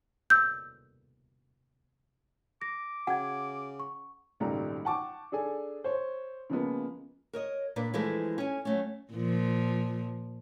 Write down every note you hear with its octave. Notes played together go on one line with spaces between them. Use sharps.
E6 G6
D6 A#6
C#3 F#4 F#5 G5 G#6
C#6
G#1 C#2 A#2 G3 A3 A#5
F#5 G5 A5 C#6 D6
D4 G#4 A4 G#5
C5 C#5
C#3 F3 G#3 A#3 B3
A#4 C#5 D#5
A#2 D4 A#4 B4
E3 F3 G#3 A3 E4 B4
C#4 G#5
F#3 A3 C#4
A#2 F3